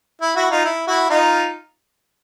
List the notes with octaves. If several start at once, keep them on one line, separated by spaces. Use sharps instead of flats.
E4
E4 F#4
D#4 F4
E4
E4 F#4
D#4 F4